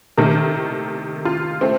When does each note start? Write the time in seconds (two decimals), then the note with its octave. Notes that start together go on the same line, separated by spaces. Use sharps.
0.17 C3 D#3 A3 A#4
1.25 F4
1.61 A3 C4